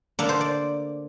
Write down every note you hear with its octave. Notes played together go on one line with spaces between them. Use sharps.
D3 A#3 D4 D5
C5
D5